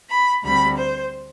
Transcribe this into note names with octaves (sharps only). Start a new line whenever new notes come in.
B5
D2 D3 G3 C4 B5
C5